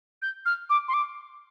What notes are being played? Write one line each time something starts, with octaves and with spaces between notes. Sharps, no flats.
G6
F6
D6
C6
D6